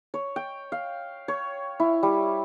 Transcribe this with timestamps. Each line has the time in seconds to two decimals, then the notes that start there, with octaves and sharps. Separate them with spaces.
0.14 C#5
0.36 G5
0.72 F5
1.28 C#5
1.80 E4
2.03 G3